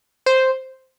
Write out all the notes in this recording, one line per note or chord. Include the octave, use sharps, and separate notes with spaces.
C5